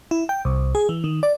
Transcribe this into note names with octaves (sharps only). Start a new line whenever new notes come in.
E4
G5
C2
G#4
E3
D#3
D5